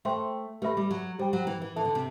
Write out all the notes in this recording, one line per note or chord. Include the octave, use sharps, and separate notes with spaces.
A3 C5 E5 G5 C6
A3 G4 B4 E5 B5
G3
F#3
G3 G4 C5 G5
F#3
E3
E3
E3 A4 E5 A5
D3
C3